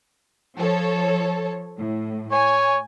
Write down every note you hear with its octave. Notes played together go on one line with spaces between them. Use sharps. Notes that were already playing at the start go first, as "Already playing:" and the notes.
F3 A4 C#5
A2
C#5 G#5